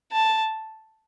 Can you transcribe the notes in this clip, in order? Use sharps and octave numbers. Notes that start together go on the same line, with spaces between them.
A5